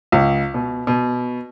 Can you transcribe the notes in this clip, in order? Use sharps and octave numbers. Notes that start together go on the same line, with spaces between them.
C#2
B2
B2